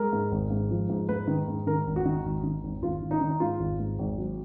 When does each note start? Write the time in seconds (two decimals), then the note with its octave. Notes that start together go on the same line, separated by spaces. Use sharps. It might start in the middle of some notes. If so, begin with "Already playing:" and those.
Already playing: G#3 A#4
0.13 G#2
0.32 G#1
0.50 G#2
0.71 F3
0.89 G#2
1.09 G#2 B4
1.27 D#3
1.48 G#2
1.67 D#3 A#4
1.87 G#1
1.96 F#4
2.05 D#3
2.25 G#1
2.43 D#3
2.63 G#1
2.82 G#1 F4
3.02 D#3
3.11 D#4
3.21 D#3
3.30 D#4
3.40 G#2 F4
3.59 G#1
3.79 G#2
3.99 G#1
4.18 F#3